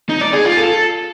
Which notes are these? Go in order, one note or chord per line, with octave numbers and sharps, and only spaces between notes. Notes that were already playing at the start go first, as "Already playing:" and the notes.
D#4
D5
G#4
F4
A4